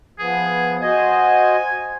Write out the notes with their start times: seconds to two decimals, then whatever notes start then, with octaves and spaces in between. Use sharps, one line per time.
0.19 F3 B3 G#4
0.82 F#4 C5 D#5 G#5